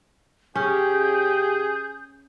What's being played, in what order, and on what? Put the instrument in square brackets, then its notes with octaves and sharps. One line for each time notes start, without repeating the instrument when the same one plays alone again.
[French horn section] C#3 G4 [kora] C#4 [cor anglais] G#4 [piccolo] G6